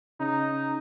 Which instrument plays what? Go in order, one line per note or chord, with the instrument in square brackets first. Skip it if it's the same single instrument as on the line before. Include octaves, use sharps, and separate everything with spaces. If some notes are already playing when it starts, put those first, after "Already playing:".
[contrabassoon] C#3 [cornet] D#4